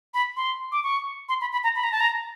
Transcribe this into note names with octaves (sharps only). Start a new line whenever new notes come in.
B5
C6
D6
C#6
C6
B5
B5
A#5
B5
A#5
A5
A#5